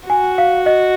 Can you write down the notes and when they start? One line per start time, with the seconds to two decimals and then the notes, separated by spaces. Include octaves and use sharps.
0.09 F#4 G#5
0.38 F5
0.66 D#5